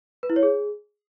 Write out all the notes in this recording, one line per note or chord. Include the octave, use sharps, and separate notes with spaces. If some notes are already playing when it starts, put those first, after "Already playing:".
B4
E4
C#5
G#4